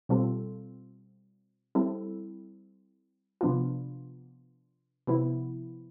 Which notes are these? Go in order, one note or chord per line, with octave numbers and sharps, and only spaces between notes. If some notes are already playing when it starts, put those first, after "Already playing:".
B2 G3 C4 F4 A4
G3 C4 E4 A4
C3 F3 B3 D4 F4
C3 F3 B3 E4